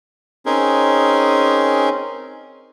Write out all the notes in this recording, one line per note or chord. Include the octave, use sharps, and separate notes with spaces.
C4 C#4 D#4 G#4 A#4